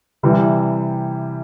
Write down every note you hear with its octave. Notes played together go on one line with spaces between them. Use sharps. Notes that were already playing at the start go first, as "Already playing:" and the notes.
C3 E3 G3